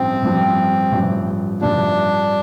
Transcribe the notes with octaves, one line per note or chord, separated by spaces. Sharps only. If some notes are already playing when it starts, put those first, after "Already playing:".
Already playing: A1 G2 F3 C4
A1 G2 F3
A1 G2 F3
A1 G2 F3 D4